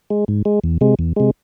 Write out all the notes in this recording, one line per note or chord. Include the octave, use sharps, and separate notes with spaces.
G#3
G#2
G#3
E2
C3 G#3
E2
C3 G#3